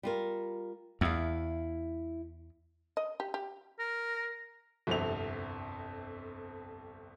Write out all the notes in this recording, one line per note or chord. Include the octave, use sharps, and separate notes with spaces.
G3 F4 A#4
E2 E4 F5
D#5
G4
G4
A#4
G1 C2 F2 C3 F7